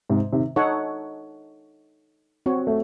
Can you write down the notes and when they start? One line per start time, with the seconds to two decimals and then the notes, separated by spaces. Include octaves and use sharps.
0.09 G#2 C3
0.33 C3 D#3
0.56 D#4 A4 C#5 F#5
2.46 C4 F#4 C#5
2.67 A3